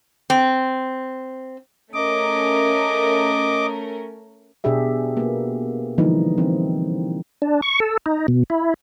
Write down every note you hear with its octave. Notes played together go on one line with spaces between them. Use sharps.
C4
A3 C#4 A#4 D#5 D6
B2 D4 G4 G#4 E5
A#3 B3
D3 E3 F3 G3 A#3 D#4
E3 C4
D4
C#6
A4
D#4
B2
E4